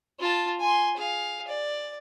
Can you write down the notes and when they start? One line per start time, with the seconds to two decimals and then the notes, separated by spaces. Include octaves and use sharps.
0.20 F4 A5
0.60 G#5 C6
0.97 G#4 F5
1.48 D5